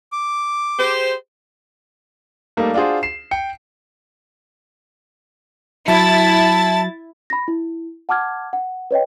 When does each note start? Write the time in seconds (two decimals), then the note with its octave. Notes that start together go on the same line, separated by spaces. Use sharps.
0.12 D6
0.79 G4 G#4 C5
2.57 G3 A3 A#3 D#4
2.74 D4 F4 F#4 G#4 C5
3.03 C7 E7
3.31 G5 C#7
5.88 F#3 E4 A5 A6
7.30 B5 A#6
7.48 E4
8.09 F#5 A5 D6 F6 G#6
8.53 F#5
8.91 B4 C#5 D#5 G5